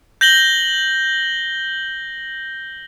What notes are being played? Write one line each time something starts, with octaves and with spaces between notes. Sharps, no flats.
G6 A#6 F#7 G7